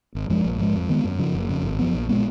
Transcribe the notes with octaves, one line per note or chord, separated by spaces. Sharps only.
G#1
F#2 F3 G#3
A#1
G#2 F3 G#3
F2
D#3 G#3 B3
F#2
C#3 F3
F#1
F2 C#3
G#1
F#2 F3 B3
A#1
A#2 G#3 B3